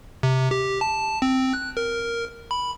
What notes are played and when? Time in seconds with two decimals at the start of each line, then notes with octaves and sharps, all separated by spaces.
0.23 C3
0.51 G4
0.81 A5
1.22 C4
1.53 F#6
1.77 A#4
2.51 B5